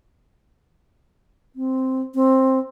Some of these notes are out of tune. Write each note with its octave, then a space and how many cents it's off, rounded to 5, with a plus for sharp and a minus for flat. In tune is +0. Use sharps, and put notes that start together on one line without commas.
C4 +0
C4 +10